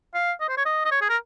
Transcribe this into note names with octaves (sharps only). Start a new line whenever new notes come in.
F5
D#5
C5
C#5
D#5
D#5
C#5
G#4
A#4